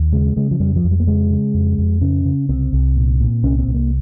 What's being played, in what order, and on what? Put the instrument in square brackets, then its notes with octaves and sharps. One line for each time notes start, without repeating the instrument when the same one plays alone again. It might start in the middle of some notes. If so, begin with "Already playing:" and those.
Already playing: [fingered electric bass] D#2
C#3 G#3
C#3 G#3
F3
F2 G3
F3
F2
G3
A#3
C#3 G#3
C#3
F2
F2
C#3 C#4
C#3
C2 C4
C2
A#2
A#2
C2 C#4
C4
C2
A#3